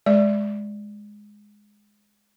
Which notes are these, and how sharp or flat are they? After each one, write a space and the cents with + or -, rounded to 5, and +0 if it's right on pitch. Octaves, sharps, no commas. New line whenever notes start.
G#3 +0 D5 +0